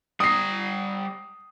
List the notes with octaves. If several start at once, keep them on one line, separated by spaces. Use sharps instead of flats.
G3 A#5 D#6 C7